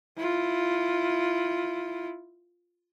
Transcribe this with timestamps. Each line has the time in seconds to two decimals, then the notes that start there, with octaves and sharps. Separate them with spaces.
0.17 E4 F4